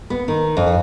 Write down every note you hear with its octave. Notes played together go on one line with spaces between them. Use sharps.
B3
D#3
F2